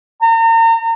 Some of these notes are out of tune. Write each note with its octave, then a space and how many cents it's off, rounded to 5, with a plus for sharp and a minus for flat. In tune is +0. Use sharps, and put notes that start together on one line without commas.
A#5 -40